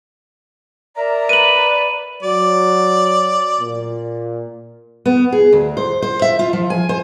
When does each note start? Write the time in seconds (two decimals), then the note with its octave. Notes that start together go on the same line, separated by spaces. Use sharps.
0.97 A#4 D5 E5 A#5
1.29 B4 D#7 F#7
2.23 F#3 D5
3.60 A#2
5.05 B3
5.32 G#4
5.53 D2
5.77 C5
6.02 C5
6.22 E5
6.39 F4
6.53 F3
6.70 G#5
6.89 C5